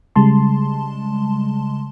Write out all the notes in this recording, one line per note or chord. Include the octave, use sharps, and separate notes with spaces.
C#3 G3 G#3 A5 C6